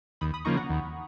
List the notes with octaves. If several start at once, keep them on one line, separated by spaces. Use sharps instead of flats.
D#2 B5 D#6
B5 D#6
C#3 F3 A#3 D#4 A#5 C#6
F#5 A#5
D#2